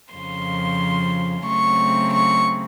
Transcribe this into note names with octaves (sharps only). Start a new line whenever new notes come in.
F2 C#3 F3 C6
C#3 F#3 A3 C4 C#6
C#6